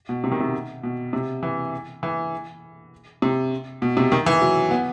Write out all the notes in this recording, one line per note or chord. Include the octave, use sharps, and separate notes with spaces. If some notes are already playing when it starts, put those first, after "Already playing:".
B2
C3
D#3
C3
B2
C3
E3
E3
C3
B2
C3
D#3
E3
F#3
B3